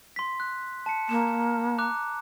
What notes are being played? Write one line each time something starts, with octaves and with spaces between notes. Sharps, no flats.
C6 B6
F#6
A5 C#7
A#3 E7
A#5 D6 F#6